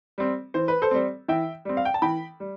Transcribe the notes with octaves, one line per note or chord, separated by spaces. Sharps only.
G3 C4
E3 C5
B4
A4 C5
G3 C4
E3 E5 G5
G3 C4
F5
G5
A5
E3 G5 B5
G3